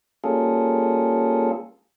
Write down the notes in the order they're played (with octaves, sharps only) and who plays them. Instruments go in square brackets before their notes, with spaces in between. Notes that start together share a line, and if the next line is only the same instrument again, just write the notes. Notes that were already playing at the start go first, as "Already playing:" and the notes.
[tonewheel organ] G3 A#3 C#4 F4 G#4 A4